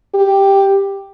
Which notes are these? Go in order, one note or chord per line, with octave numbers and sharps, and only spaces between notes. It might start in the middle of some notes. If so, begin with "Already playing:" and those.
G4